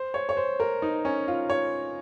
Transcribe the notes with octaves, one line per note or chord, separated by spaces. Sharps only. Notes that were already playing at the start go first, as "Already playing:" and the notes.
Already playing: C5
C#5
C#5
C5
A#4
D#4
C#4
F4
C#5